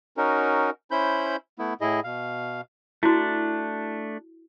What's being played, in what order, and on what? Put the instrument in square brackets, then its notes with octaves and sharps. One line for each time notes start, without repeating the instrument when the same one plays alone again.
[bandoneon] C#4 D#4 F#4 A#4
C#4 E4 C5 B5 G6
A3 B3 E4
A2 E4 G#4 D#5
B2 F5
[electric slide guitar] A3 D4 [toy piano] E4 F#4